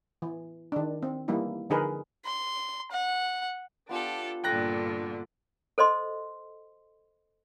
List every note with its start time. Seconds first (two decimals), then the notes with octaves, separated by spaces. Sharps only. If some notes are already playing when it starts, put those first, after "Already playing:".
0.22 E3
0.72 D#3 D4
1.03 C4
1.28 E3 G3 A#3 D#4 E4
1.70 D3 F3 D#4 G#4 A#4 B4
2.25 C6
2.92 F#5
3.89 B3 D4 F4 G4 A4
4.44 G2 A#2 D3 G5 F#6 A#6
5.78 A4 C5 D#5 C6